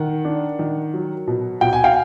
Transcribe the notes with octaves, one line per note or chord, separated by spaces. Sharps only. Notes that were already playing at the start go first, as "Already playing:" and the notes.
Already playing: D#3 F#5
D4
D#3
F#3
B2
B2 G5
G#5
F5 G5